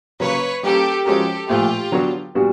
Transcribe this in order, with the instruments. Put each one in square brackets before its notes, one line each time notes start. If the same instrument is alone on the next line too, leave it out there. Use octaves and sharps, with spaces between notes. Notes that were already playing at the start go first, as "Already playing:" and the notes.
[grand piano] C#3 F#3 A#3 [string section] B4 C#5
[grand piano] G3 A#3 C#4 [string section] G4 A4
[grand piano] F3 G#3 C#4 F#4 A#4 [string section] G4 A4
[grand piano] A#2 F3 A3 [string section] F4 G4
[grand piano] D3 F#3 B3 D4 F#4
A#2 G3 B3 D4 F#4